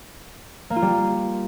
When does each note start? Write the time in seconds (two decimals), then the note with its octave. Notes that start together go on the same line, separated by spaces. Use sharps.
0.70 A#3
0.76 F4
0.82 G3